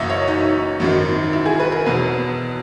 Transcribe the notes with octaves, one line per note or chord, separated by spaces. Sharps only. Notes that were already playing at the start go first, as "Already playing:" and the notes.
Already playing: F#1 F#2 E3 D#5 E5
C#5
D#4
G#1 F#2 D#3
E4
G#4
B4
A#4
E2 B2 F#3 B4